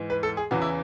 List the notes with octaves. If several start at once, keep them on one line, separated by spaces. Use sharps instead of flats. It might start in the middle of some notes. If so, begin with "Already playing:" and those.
Already playing: G#2 E3
B4
A4
G#4
E2 C#3 E3 F#4
E4